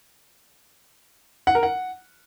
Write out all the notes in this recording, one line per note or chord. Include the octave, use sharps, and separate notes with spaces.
F#5
A#4
F#5